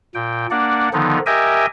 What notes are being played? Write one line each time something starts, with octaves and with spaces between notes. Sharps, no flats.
A#2 G5
A#3 D4 D5 F#5
D3 D#3 F3 B3 D#4
G4 A#4 D#5 E5 G5 G#5